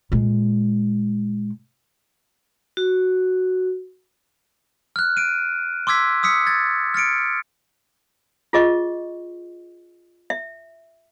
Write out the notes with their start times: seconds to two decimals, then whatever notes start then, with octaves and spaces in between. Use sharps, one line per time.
0.12 A#2 G#3
2.77 F#4
4.96 F6 F#6
5.17 D7 D#7
5.87 C6 D6 E6 G#6 B6
6.23 D#6 E6 B6 C#7
6.47 G#6 A6
6.94 F6 A6 C#7 D7
8.53 F4 G#4 D#5 C#6
10.30 E5